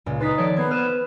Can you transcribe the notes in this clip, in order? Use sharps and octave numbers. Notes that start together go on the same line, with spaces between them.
C#2 A#2
D#4 B4 C6 A6 B6
D#3 F3 A4 C#5 D5 A5
B3 G#6 C7
B4 C5 F6 D#7 E7